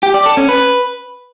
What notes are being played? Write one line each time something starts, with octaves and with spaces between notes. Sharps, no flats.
G4
D5
A4
C#4
B4